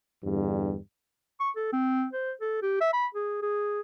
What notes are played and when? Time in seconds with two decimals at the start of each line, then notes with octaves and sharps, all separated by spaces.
0.23 E2 G2 D3 G3
1.40 C#6
1.57 A4
1.73 C4
2.13 C5
2.41 A4
2.62 G4
2.81 E5
2.93 B5
3.15 G#4
3.42 G#4